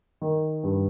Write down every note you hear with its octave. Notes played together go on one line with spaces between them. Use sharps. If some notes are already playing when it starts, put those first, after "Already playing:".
D#3
G2